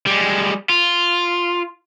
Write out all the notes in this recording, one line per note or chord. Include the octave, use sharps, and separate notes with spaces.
G3 G#3
F4